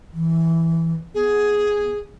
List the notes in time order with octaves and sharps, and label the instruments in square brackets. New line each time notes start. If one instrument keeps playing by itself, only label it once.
[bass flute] E3
[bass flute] B3 [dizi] G#4